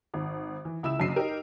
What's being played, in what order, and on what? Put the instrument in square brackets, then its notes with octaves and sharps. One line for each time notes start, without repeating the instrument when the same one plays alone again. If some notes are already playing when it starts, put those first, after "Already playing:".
[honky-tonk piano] G#1
E3
C#2 E4 E6 E7
F#1 F#2 D3 C7 D#7
D#4 G4 A#4